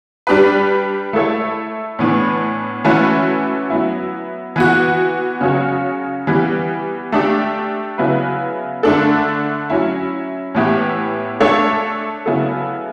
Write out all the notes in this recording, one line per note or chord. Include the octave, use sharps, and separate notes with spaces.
G3 D4 G4 B4
A3 E4 A4 C#5
A2 E3 B3 D4
E3 A3 C#4 F#4 B4
F#3 B3 E4
E3 B3 F#4
C#3 F#3 C#4 F#4 C#5
E3 G3 B3
A3 D4 G4
C#3 F#3 B3 E4 B4
D3 A3 D4 A4
F#3 C#4 E4
A2 E3 B3 E4 G4
A3 D4 A4 C#5
C#3 F#3 B3 E4 A4